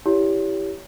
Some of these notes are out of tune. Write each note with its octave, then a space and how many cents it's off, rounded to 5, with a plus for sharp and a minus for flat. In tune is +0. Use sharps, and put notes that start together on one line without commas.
E4 +0 G4 +0 C#5 +30